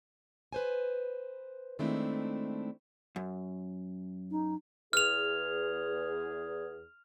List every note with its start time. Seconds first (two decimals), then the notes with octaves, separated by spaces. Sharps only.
0.53 B4 C5 G#5
1.79 D#3 G#3 A3 C4 D4 E4
3.16 F#2
4.31 D#4
4.93 E2 G#4 F6 F7